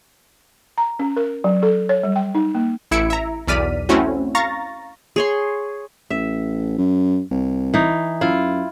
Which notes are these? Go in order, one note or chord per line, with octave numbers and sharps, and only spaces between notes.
A#5
C#4
A#4
F#3
A4
C#5
G3
G5
D#4
A#3
A1 E4 E6 G#6 C#7 D7
E5 A#5
B1 E2 D5 F6 B6 D#7
A3 C4 C#4 E4 F#4
F5 A#5 C#6 A6 A#6
G#4 C#5 C6
A1 E5
F#2
C2
E3 D#4
F#2 E4 F4